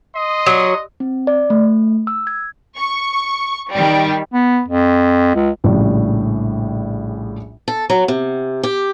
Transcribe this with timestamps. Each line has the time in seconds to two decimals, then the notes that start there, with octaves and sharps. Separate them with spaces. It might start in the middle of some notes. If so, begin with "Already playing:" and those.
0.15 D#5 C6 D#6
0.46 F#3
1.00 C4
1.27 D5
1.50 A3
2.07 E6
2.27 G#6
2.76 C#6
3.71 D#3 G3
4.32 B3
4.68 F2
5.35 C#2
5.64 A#1 A2 C#3 G3
7.68 A4
7.90 F#3
8.08 C3
8.63 G4